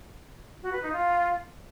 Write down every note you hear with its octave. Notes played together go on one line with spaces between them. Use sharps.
F#4
B4
D#4
F4